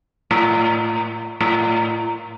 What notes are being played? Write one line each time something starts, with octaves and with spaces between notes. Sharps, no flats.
A2
A2